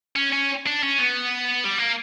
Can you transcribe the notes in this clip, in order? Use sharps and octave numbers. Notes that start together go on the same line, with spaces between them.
C#4
C#4
D4
C#4
B3
G3
A#3